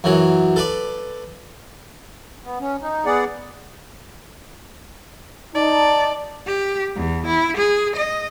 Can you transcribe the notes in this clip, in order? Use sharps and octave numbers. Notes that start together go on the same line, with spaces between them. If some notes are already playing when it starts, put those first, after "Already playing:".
F#2 E3 F#3
A4 B4 D5
B3
C#4
D#4
B3 G#4 D5 F#5
D#4 D5 A5
G4
E2
E4
G#4
D#5